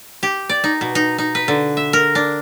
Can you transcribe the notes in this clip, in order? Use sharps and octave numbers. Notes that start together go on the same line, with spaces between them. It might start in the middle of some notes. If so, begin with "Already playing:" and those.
G4
D5
D#4
B2
D#4
D#4
B4
D3
E5
A#4
D4